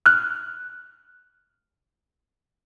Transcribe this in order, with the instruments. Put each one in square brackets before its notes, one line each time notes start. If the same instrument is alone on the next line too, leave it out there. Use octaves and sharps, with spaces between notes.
[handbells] F6 F#6